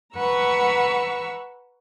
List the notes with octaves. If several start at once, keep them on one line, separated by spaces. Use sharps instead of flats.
B4 F#5 A#5 C#6 E6